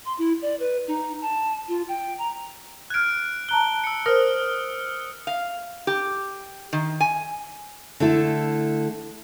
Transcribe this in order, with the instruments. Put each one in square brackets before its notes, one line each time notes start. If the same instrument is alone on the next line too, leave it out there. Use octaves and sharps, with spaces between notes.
[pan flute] C6
E4
D5
B4
D#4
A5
F4
G5
A#5
[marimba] F6 G#6 [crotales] F#6 D7
[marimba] A5 A#5 F#6 [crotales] G7
[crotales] E6 C#7
[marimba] A#4 C5 [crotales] D#6 F6
[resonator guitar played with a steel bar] F5
G4
D#3
G#5
[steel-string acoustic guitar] D3 A3 E4 A4